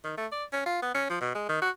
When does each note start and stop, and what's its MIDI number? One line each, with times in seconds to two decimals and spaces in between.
0.04 0.14 51
0.18 0.27 57
0.32 0.44 74
0.52 0.63 61
0.66 0.80 65
0.83 0.92 59
0.95 1.08 61
1.10 1.19 53
1.21 1.33 47
1.35 1.44 56
1.49 1.57 51
1.62 1.70 66